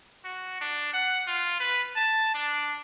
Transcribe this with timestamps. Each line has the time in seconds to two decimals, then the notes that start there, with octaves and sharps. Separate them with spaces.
0.25 F#4
0.61 D4
0.93 F#5
1.27 F4
1.60 B4
1.96 A5
2.34 D4